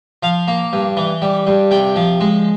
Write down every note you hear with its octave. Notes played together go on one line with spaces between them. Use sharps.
F3 F5
A#3
G2
E3
G3
G2
C3 G5
F3
G#3